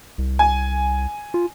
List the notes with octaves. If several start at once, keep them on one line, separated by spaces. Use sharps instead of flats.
C2
G#5
F4